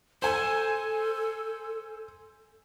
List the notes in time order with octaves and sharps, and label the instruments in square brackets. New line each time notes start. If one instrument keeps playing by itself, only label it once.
[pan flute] A4 [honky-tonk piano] C5 G#5